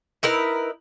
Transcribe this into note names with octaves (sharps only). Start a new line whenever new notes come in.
D#4 E4 A#4 B4